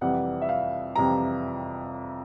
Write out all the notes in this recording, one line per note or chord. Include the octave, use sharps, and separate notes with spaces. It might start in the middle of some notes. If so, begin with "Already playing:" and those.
F2 C3 E3 G3 F#5
E5
F5
F2 C3 E3 G3 A#5